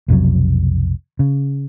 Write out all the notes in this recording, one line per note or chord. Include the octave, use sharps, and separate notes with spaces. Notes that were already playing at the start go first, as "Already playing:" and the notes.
B1 F2 C3 F#3
C#3